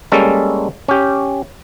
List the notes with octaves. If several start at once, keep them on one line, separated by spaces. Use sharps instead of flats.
G3 G#3 A#3 C#4 A4
C#4 G4